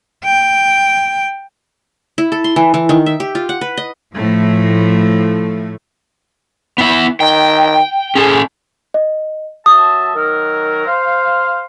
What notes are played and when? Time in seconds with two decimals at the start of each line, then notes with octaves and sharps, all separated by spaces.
0.25 G5
2.18 E4
2.32 A4
2.44 C6
2.56 E3
2.74 E3
2.89 D#3
3.06 E5
3.20 G4
3.35 F4
3.49 F#5
3.61 B4
3.77 D#5
4.14 A2 F3 A3
6.78 B3 E4 E5
7.20 D#3 G5
8.15 C#4 G#4 A4
8.94 D#5
9.66 F#3 E5 A5 D#6
10.15 D#3 F#3 A#4
10.86 C5 F5